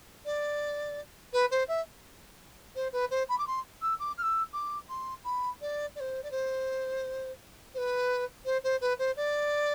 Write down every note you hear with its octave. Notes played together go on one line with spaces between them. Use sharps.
D5
B4
C5
E5
C5
B4
C5
B5
D6
C6
E6
D6
F6
E6
D6
C6
B5
D5
D5
C5
D5
C5
C5
B4
C5
C5
B4
C5
D5